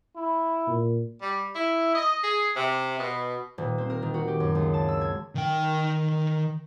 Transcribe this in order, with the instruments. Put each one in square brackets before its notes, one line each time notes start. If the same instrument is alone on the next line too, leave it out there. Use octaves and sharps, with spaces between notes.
[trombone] E4
[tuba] A#2
[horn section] G3
E4
D#5
G#4
C3
B2
[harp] D#1
C4
A#4
D#3
F#4
G4
F#2
C#2
A5
E6
G#6
[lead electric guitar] D#3 G5